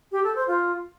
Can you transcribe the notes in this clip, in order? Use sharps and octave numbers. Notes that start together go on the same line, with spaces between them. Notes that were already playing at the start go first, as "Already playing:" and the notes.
G4
A4
C5
F4